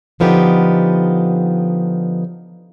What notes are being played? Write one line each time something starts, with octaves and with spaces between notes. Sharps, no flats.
D3 F3 B3 D#4 G4